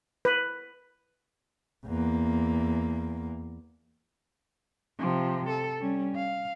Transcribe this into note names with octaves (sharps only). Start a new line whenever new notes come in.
B4
E2 A#3
C3 F3
A4
G3 C#4
F5